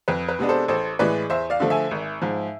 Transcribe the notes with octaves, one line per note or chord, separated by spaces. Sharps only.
F2 B4
B4
C3 G#3 B3 D4
A4 C5
A1 A4 C5
A2 E3 G#3 B4 D5
E2 C5 E5
D5 F5
D3 F3 A3
E5 G#5
G#1
G#2 F3